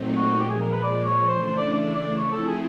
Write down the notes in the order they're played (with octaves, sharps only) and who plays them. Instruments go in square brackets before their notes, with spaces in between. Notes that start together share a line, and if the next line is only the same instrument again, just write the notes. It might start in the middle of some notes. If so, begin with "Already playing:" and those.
Already playing: [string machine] A#2 F#3 A3 C4 D#4
[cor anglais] F#4
[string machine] A#2 F3 G#3 [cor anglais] G4
[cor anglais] G#4
A#4
B4
D5
C#5
[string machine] C#3 E3 A3 D4 [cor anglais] C5
[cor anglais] C5
D5
D5
D5
[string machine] F3 A3 C4 E4 [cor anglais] C#5
[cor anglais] A4
G#4